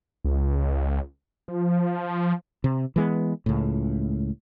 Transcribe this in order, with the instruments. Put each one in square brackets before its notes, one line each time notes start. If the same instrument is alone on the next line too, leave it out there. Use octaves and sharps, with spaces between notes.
[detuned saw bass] C#2
F3
[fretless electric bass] C3
E3 G#3 B3
C#2 A2